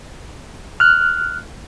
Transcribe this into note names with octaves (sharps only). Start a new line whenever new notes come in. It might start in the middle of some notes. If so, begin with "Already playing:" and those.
F6 F#6